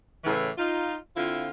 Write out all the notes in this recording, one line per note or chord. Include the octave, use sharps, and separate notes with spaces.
A2 C#3 E3
D#4 F4
D3 C4 E4 F4